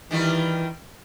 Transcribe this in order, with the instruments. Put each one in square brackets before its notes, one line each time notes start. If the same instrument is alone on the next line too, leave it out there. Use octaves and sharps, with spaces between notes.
[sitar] D#3 G3 F4 [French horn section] E3